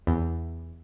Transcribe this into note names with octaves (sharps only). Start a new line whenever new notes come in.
E2